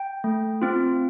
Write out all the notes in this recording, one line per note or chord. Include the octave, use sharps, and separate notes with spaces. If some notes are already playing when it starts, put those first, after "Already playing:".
Already playing: G5
A3
C4 F4